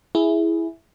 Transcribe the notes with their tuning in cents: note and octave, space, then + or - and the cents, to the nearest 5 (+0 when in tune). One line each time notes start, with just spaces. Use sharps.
E4 +0 G#4 +0